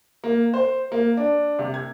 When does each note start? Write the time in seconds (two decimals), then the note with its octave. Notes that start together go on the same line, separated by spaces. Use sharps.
0.24 A#3
0.54 C5
0.92 A#3
1.17 D4
1.59 C3
1.74 G#6